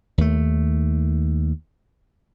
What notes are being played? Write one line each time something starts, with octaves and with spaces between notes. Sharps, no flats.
D#2 A3